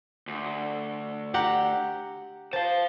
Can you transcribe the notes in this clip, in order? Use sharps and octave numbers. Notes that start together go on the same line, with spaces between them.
D2
G4 F#5 A#5
C5 F5 A5